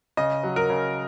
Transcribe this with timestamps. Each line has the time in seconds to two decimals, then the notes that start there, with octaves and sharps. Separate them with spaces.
0.17 C#3 D#5
0.43 F#3
0.56 A#4
0.70 C#3